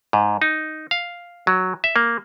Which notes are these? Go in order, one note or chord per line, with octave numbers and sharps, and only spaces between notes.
G#2
D#4
F5
F#3
E5
A#3